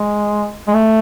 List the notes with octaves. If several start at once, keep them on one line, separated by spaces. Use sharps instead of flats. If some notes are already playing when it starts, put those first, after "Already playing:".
Already playing: G#3
G#3
A3